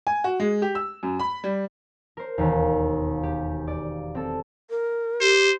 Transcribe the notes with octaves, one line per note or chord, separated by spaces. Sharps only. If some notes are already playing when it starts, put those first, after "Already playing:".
G#5
F#4
G#3
G4
E6
F#2
B5
G3
A#4 C5
E1 D#2
G4
D5
C4 A4
A#4
G4 C5